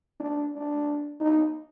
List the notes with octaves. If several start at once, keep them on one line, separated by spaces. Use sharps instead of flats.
D4
D4
D#4